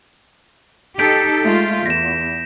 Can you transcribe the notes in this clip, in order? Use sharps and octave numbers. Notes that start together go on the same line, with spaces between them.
D#4 G4 A4 G6 B6 D7
G#3 A3 F4
E2 A#6 E7